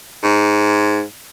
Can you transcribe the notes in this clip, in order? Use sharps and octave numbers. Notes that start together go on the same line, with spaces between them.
G#2